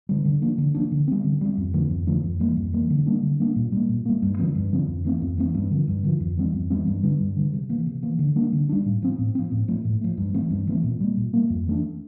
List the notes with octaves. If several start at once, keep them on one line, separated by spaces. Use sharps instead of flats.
D3 G3
D3
F3 A#3 D4
D3
F3 A#3 D4
D3
G3 C4
D3
G3 C4
F2
D3 F3 A3
F2
D3 F3 A3
F2
E3 G3 A#3
F2
E3 G3 A#3
D3
G3 A#3 D4
D3
G3 A#3 D4
A#2
G3 A#3
A#2
G3 A#3
G2
D3 F3 C4
G2
D3 F3 C4
F2
E3 A3 C4
F2
E3 A3 C4
G2
D3 F3
G2
D3 F3
F2
E3 G3 C4
F2
E3 G3 C4
G2
D3 G3
G2
D3 G3
C3
E3 A#3
C3
E3 A#3
D3
G3 A#3 D4
D3
G3 A#3 D4
A2
F3 C4
A2
F3 C4
A2
F3 A3
A2
F3 A3
G2
E3 A3 C4
G2
E3 A3 C4
A#2
G3 A#3
A#2
G3 A#3
F2
E3 A3 D4